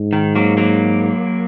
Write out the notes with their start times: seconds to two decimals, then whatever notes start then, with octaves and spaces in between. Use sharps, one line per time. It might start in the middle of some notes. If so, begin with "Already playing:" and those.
Already playing: G#2
0.13 D#3
0.35 F#3 A#3
0.57 F#3 A#3